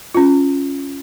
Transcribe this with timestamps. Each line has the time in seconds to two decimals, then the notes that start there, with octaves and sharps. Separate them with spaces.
0.15 C#4 F4